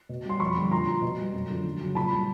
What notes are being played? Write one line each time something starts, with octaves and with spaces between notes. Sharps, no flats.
B2
G3 C6
F2 B5 C#6
D3 G3
A#2 A#5 C6
F3
B2
G3
F#2
D3 F3
F#2
C#3 F#3
A#2 A5 B5
G3